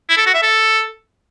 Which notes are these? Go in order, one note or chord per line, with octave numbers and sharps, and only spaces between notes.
E4
A4
F#4
E5
A4